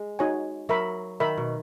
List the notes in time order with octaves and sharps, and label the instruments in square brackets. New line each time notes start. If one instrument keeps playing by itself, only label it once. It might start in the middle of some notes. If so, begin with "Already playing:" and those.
Already playing: [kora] G#3
[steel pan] D#4 F#4 C#5 G#5
[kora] F#3 [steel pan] A#4 E5 B5
[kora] D#3 [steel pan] A#4 E5 B5
[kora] B2